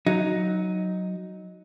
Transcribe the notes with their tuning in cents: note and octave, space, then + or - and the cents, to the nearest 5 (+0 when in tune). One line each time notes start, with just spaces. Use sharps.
F#3 +0 D#4 +0